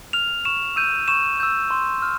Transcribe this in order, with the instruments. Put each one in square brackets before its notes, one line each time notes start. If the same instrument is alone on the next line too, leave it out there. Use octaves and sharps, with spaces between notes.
[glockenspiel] F6 F7
C#6 E7
E6 G6 D#7
C#6 E7
E6 G6
C6
F6